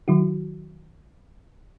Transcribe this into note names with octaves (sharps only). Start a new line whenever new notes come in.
D#3 F#3 E4 F#4